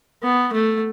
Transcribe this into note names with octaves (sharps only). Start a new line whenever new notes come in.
B3
A3